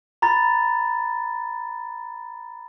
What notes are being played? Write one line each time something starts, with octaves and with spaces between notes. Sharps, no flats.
A#5 B5 A6